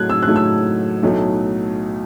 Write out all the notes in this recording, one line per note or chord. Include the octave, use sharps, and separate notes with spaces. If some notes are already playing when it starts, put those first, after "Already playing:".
Already playing: A2 F#3 A3 F#6 G#6
E6
F#6
A2 F#3 A3
E6
B1 A2 F#3 A3 D#4